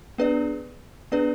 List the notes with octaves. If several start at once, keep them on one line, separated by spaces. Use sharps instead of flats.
B3 D4 G#4 B4 D5
B3 D4 G#4 B4 D5